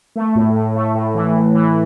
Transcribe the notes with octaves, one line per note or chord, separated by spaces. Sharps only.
A3
A2
A2
A3
A2
E3
A2
E3